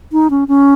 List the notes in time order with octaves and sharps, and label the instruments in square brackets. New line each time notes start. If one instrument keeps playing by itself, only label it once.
[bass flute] D#4
C#4
C#4